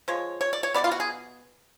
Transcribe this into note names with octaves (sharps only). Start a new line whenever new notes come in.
F3 G#3 C#5
C#5
D5
C#5
B2 G#3 B3 D5
F4
F#4
G#4